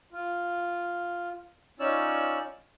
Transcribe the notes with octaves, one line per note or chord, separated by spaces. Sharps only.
F4
C#4 D#4 F4 C#5 D5 E6